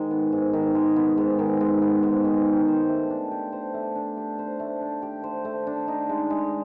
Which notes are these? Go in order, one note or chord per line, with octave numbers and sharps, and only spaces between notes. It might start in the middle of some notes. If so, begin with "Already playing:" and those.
Already playing: G#2 D#3 G#3
B3
G#2
D#3
G#3
B3
G#2
D#3
G#3
B3
G#2
D#3
G4
C5
A3
D4
G4
C5
A3
D4
G4
C5
A3
D4
G4
C5
A3
D4
D#4
G#3
G#3